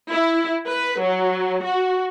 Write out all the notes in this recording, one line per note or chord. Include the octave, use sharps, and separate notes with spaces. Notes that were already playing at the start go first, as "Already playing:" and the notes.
E4
B4
F#3
F#4